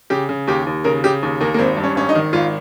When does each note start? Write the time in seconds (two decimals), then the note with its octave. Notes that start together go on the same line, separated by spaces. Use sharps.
0.10 C#3 G4
0.29 C#3
0.47 D#2 G4
0.66 D#2
0.84 C#3 A#4
1.04 C#3 G4
1.23 D#2
1.40 D#2 A#3
1.54 A#3
1.59 G#1 C4
1.77 G2
1.84 C#4
1.95 G#1 C#4
2.09 D#4
2.15 D#3
2.33 G#1 F4